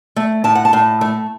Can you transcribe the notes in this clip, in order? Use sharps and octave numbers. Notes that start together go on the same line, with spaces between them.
A3
A2 A5
F#5
A5
A2
A3